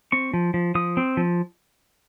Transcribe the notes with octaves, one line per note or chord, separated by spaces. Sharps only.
C4 C#6
F3
F3
F3 D#6
C4
F3